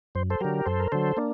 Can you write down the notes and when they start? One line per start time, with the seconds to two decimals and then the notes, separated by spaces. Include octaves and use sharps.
0.15 F#2 C5
0.30 A4 C5
0.40 D3 F#3 G4 A#4
0.66 F#2 A4 C5
0.80 A#4
0.92 D3 F#3 A4 C5
1.17 A#3 D4